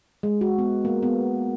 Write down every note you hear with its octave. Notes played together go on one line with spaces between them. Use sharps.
G#3
F#4
B3
A#3
B3